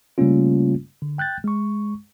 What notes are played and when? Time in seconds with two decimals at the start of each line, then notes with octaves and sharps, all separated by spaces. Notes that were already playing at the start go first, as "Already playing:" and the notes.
0.18 C#3 G3 A3 A#3 C#4 F4
1.02 D3
1.18 G5 F#6 G6 A6
1.44 G#3 C#6